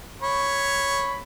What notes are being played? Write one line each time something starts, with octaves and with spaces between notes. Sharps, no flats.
C#5 B5